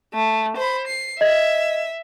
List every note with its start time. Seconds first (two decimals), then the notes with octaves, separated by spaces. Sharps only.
0.14 A3
0.57 C5 B5
0.87 C7
1.21 D#5 E5 G#6